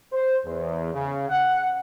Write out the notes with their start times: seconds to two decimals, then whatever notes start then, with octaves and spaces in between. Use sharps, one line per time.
0.13 C5
0.45 E2
0.94 C#3
1.29 F#5